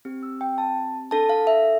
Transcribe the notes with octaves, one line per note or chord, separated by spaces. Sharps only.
C4 G4
E6
G5
A5
D4 A4 A5
F5
E5